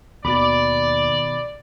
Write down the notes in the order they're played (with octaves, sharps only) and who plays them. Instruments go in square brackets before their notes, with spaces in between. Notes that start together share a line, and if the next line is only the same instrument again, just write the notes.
[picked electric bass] D#2 [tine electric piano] B2 D#3 B5 [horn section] D5